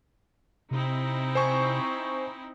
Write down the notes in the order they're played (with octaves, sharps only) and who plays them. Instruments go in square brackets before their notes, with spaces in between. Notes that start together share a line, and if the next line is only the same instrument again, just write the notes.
[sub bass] C3 [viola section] C4 D#4 E4
[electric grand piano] C5 G#5 C#6